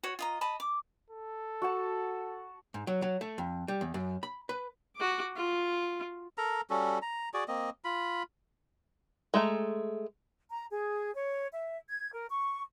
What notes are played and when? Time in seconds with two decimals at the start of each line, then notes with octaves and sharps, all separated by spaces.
0.03 F#4 C#5
0.19 F4 D#5 A#5
0.41 D#5 A5 B5
0.60 D6
1.10 A4
1.62 F#4 F#5 A5
2.74 G#2
2.87 F#3
3.02 F#3
3.21 A3
3.38 F2
3.68 G3
3.81 E2
3.94 F#2
4.23 B5
4.49 B4
4.96 F#4 D6
5.36 F4
6.38 A4 A#4 A#5
6.70 G3 C#4 F#4 A4
7.02 A#5
7.34 F#4 G#4 D5
7.48 A#3 C4 D#5
7.84 F4 B5
9.34 G#3 A3 A#5
10.50 A#5
10.70 G#4
11.14 C#5
11.53 E5
11.90 G#6
12.14 A#4
12.30 C#6